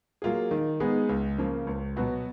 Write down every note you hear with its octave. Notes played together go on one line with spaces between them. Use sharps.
F#3 A#3 F4 G#4
D#3
G#3 B3 D#4 G#4
C#2
C#3 F3 A#3
C#2
B2 F#3 B3 F#4